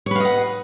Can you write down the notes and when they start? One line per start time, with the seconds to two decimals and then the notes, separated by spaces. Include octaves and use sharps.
0.06 C#5
0.11 B4
0.16 F5
0.20 D#5
0.25 F#5